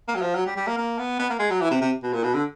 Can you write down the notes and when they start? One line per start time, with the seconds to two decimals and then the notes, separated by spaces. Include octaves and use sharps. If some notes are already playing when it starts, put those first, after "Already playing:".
0.08 A#3
0.15 F#3
0.22 F3
0.35 F#3
0.46 G3
0.56 G3
0.67 A#3
0.78 A#3
0.99 B3
1.19 B3
1.30 A#3
1.39 G#3
1.50 F#3
1.61 E3
1.71 C3
1.81 C3
2.03 B2
2.13 A#2
2.24 B2
2.34 D3